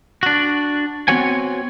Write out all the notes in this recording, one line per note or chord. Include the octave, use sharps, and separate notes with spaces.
D4 F#4
B3 C4 F#4 C#5 F#5 G#5